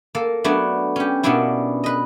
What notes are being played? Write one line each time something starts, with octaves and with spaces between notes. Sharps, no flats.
A#3 A4
F#3 A3 B3 D4 F#4
C#4 G4
B2 A#3 B3 C#4 D4 E4
B4 D#5